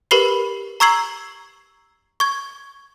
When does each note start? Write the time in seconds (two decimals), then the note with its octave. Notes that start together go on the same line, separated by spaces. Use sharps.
0.11 G4 A#4 B4 B5 C7 G7
0.80 A#5 C#6 E6 G#6 C7 F#7
2.20 C#6 G#6